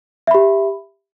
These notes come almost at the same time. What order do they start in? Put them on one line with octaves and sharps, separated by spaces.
E5 B5 G4